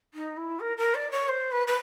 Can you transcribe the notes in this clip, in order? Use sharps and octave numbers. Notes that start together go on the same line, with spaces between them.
D#4
E4
A#4
A#4
D5
C#5
C5
B4
B4